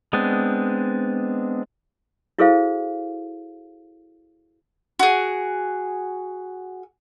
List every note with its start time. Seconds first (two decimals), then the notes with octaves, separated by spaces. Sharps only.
0.13 G#3 B3 C4 D4
2.38 E4 F#4 G#4 A4 C5 F5
4.99 F#4 G#4